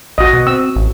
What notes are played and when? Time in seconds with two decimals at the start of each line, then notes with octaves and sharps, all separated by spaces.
0.18 A#1 F#4 D#5
0.33 B2
0.47 C4 E6
0.76 A1